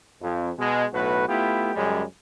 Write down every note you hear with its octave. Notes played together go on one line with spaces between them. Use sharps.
F2
B2 G#3
B1 A2 F#4 B4
A3 B3 E4 F4 G4
F#2 C#3 G3 G#3